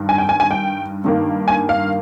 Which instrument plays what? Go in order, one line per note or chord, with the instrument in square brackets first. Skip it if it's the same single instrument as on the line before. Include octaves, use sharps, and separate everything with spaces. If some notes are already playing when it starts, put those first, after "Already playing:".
Already playing: [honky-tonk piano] G2 D#3
G#5
G5
G#5
G#5
G5
G2 D#3 A#3
G#5
F5